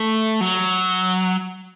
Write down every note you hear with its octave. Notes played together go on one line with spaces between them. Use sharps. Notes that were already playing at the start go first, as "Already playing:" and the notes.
Already playing: A3
F#3